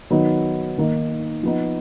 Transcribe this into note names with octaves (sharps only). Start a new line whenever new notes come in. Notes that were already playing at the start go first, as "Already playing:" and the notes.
D#3 F#3 B3 D#4
D#3 A#3 D#4
F3 B3 D#4